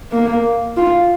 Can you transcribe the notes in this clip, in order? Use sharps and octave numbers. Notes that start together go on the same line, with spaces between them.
A#3
F4